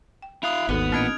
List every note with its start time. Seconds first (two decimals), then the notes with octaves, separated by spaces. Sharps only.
0.22 G5
0.43 E4 F5 D#6 F#6 F7
0.69 G#1 D#2 B3 D#4 F#4 A4
0.92 A1 A#2 C4 D4 D#5 F6 G#6 D7